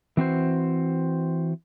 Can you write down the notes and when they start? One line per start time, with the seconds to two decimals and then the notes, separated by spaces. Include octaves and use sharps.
0.17 E3 C4 F#4 C5